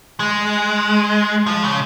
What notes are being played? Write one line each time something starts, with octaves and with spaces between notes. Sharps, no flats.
G#3
F3
C#3